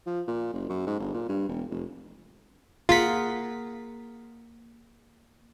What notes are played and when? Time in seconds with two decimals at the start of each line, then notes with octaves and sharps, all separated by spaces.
0.06 F3
0.28 A#2
0.54 F#1
0.70 F#2
0.87 G#2
1.00 G1
1.14 A#2
1.29 G2
1.48 E1
1.71 F1
2.89 A#3 F4 G#4 A#4 F#5 B6